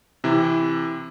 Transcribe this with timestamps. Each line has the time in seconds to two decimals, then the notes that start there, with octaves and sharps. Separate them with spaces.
0.24 C3 E3 E4